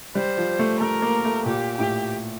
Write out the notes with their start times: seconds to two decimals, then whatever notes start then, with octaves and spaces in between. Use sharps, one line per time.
0.15 G3 C5
0.37 F3
0.59 A3
0.80 A3 A#4
1.02 A#3
1.25 A3
1.46 A#2 G4
1.78 A2 G4